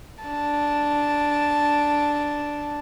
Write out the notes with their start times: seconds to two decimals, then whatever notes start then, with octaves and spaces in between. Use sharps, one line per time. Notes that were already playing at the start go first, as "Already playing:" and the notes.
0.24 D4 A5